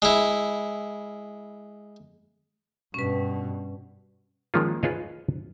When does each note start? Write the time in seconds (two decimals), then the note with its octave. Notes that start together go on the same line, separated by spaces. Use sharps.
0.02 G#3 E4
2.94 G2 B2 C#4 B4
4.54 D#3 F3 G#3 A#3 C#4 F4
4.83 F4 G#4 B4 C#5 D#5 F5